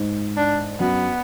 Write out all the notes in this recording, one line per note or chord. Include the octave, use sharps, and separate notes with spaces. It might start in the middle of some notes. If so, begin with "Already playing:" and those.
Already playing: G#2
D4
F#2 B3